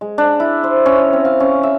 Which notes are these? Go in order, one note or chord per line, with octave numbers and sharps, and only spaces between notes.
G#3
D4
E4
C5
C#4
C4
F5
C#4
E5